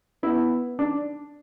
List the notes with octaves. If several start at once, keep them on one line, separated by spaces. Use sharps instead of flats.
B3 E4
D4